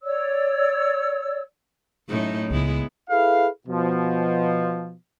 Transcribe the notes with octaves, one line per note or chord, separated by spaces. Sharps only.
C#5 D5 E6
F#2 A2 D#4
C#2 G#3 B3 E4
E4 G#4 A4 B4 F5
B2 F3